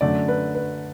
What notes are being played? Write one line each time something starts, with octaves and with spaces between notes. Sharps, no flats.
F#2 D3 A3 D5
B4
B4